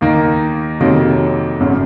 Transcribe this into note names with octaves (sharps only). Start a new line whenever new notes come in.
D#2 D#3 A#3 D#4
F2 C3 D#3 F#3 A#3
G#1 F#2 C#3